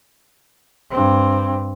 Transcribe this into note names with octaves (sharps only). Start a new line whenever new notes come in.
G2 C4